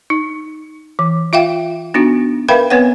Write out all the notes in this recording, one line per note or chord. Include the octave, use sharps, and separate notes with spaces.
D#4
E3
F4 E5 F5 G5
B3 D4 D#4 F#4
A#4 B4 E5 F5 G5 B5
B3 C4 B4 C#5 F#5